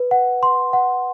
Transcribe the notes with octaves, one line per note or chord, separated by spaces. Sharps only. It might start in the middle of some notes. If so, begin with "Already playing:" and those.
Already playing: B4
F#5
C6
F#5